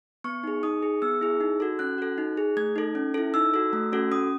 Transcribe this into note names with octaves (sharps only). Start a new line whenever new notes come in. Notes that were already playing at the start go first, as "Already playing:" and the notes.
B3 C#6
D#4 G#4
D#4 D#6
G#4
B3 E6
E4 G#4
D#4
F#4 A4
C#4 F#6
F#4 A4
D#4
G#4
A3 G#6
D#4 A4
C#4
E4 A4
D#4 E6
F#4 A4
A3
C#4 F#4 A4
C#4 D#6